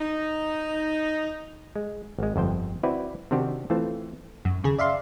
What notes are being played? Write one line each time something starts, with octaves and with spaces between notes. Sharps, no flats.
D#4
G#3
G#1 G#3
G1 F2 C5 G5
C4 E4 F#4 B4 D5
C3 D#3 C4 D4 F#4 G4
E3 A3 C4 F4 A5
F#2
D#2 C#3 G#4
D5 E5 F5 C6